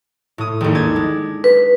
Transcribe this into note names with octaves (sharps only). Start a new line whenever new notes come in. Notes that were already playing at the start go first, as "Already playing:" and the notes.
A2 D#6
G#1 D#2
D4 G#6 A6
G#3
B4